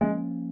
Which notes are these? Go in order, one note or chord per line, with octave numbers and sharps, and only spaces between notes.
F3 G#3 A#3 C#4